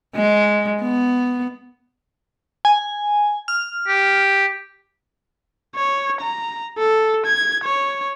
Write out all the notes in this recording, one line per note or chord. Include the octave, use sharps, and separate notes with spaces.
G#3
B3
G#5
F6
G4
C#5
A#5
A4
G#6
C#5